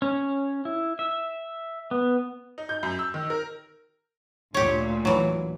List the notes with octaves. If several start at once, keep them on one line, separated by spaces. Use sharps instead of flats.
C#4
E4
E5
B3
D#4
G6
F#2
E6
D#3
A#4
D2 A#2 G4 C#5
E3 F#3